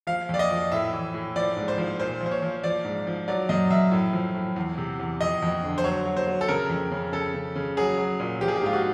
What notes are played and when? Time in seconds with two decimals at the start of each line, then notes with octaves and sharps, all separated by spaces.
0.07 F3 F5
0.29 F2 D5
0.39 D#5
0.50 F3
0.72 A2 E5
0.93 E3
1.14 A2
1.36 F3 D5
1.56 G#2
1.68 C5
1.78 F3
1.99 A#2 C5
2.21 F3
2.26 C5
2.31 C#5
2.42 F3
2.63 F3 D5
2.85 G#2
3.07 F3
3.28 F#3 D5
3.49 F#2 D#5
3.70 F#2 E5
3.91 A2
4.13 F3
4.35 A2
4.56 E2
4.78 C3
4.99 E2
5.21 F2 D#5
5.42 F2
5.63 D3
5.78 C5
5.84 F#3 C#5
6.05 F#3
6.17 C5
6.27 F#3
6.41 A4
6.48 C#3 A#4
6.70 F2
6.91 C#3
7.12 C#3 A4
7.34 C#3
7.55 C#3
7.77 F#3 G#4
7.98 F#3
8.20 A#2
8.41 F3 G4
8.48 G#4
8.56 G4
8.62 G#2 F4
8.73 F#4